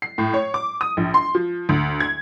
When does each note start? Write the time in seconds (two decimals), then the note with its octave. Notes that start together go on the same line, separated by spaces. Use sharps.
0.02 C7
0.18 A2
0.34 C#5
0.54 D6
0.81 D#6
0.97 A#1
1.14 C6
1.35 F3
1.69 D2
2.00 G#6